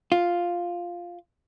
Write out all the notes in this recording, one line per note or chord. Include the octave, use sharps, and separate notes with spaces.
F4